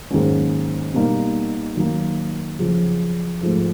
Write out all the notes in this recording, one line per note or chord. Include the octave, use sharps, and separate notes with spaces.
G#2 D#3 F#3 A#3 C#4
B2 G3 A#3 D#4
F#2 D#3 F#3 A#3
F2 C#3 F#3
G#2 F3 A3